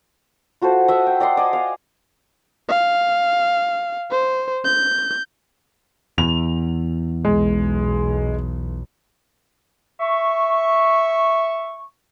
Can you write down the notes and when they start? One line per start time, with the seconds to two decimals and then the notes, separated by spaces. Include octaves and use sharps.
0.62 F4 F#4 A4 C5
0.88 D#5 E5 F#5
1.07 G5
1.20 D5 D#5 F#5 C6
1.37 D5 D#5 G#5
1.53 F5 G#5
2.69 F5
4.11 C5
4.65 G6
6.18 E2 F7
7.25 B1 G#3
10.00 E5 C#6